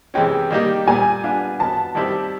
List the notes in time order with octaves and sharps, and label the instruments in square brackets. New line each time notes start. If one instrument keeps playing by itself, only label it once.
[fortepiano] C3 E3 G#3 C#4 [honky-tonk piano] G5
[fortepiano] D#3 G3 A#3 D#4 G4
[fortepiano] A#2 G3 A#3 [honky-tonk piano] G#5
[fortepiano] G3 B3 D4 F4
[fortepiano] D#3 F#3 B3 [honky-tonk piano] A5
[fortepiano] D#3 G3 C4 E4 G4